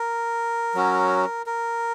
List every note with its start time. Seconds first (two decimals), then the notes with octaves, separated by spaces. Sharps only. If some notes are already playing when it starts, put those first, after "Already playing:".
Already playing: A#4
0.75 F#3 C#4 F#4
1.46 A#4